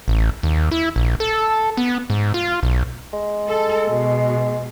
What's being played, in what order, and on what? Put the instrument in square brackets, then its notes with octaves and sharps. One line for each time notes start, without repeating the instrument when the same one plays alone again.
[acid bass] A1
D#2
E4
A#1
A4
B3
G#2
F4
B1
[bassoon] G#3
[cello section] A4
B2